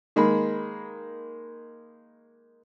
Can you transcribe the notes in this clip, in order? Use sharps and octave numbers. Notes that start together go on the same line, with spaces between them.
D#3 G#3 A#3 B5